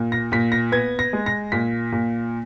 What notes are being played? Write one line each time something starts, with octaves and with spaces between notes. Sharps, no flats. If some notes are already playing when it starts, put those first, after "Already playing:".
Already playing: A#2
A#6
A#2 B6
A#6
B3 G#6
A#6
G#3
A#6
A#2 B6
A#2